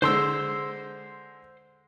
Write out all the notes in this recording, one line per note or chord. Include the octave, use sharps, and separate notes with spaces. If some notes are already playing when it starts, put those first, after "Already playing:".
D3 G#3 C5 C6 E6